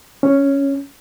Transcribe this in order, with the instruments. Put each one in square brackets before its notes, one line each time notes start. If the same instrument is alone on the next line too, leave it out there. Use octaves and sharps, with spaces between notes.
[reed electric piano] C#4